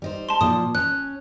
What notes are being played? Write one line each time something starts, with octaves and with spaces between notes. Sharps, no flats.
G3 D#4 C5
A5 C6
A#2 F3 D#6
C#4 F#6